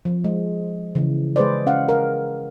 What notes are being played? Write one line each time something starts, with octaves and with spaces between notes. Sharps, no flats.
F3
G#3
C#3 E3
G#3 G#4 B4 C5 D5
C#4 F5 F#5
A#4 F5